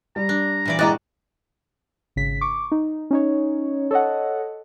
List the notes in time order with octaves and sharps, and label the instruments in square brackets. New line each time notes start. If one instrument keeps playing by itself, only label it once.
[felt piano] G3 [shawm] A#5
[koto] D4
A#2 E3 D5
[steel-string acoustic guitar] G2 D#5 A#5 [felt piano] G#3 E4 A6 [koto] F#4 [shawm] D5
[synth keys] G#1 C#3 B6
C#6 D6
D#4
C#4 D#4 C#5
A4 C#5 D#5 F#5